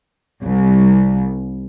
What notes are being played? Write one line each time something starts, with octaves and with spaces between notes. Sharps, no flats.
C2